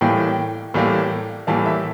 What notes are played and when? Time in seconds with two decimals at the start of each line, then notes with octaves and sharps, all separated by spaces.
0.01 A2 E3 G3 A#3 G5
0.74 A2 E3 G3 A#3
1.47 A2 E3 G3 A#3 A5
1.65 E5